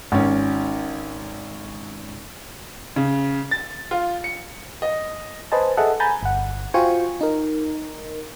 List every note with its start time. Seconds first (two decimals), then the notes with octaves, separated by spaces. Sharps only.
0.12 G#1 C#4
2.96 C#3
3.51 A6
3.91 F4
4.24 C#7
4.82 D#5
5.52 B4 C5 D#5 G#5 A5
5.77 G#4 A4 D#5 E5 F#5 A5
6.00 G#5 A#5 B5 G6 A6
6.23 G1 F#5
6.74 F4 F#4 C5 G5 G#5 C#6
7.21 D#4 A#4